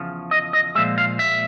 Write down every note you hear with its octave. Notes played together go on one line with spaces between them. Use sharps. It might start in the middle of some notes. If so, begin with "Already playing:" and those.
Already playing: E2 C#3 F3
D#5
D#5
A#2 F3 G#3 E5
F5
E5